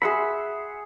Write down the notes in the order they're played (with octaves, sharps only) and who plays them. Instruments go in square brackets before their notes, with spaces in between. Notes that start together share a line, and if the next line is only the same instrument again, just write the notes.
[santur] G#4 C6 E6 [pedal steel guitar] E5 F#5 B5